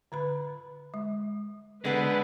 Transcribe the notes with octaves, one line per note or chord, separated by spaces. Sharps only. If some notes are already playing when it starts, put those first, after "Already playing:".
D3 B4 B5
G#3
D3 G#3 B3 B4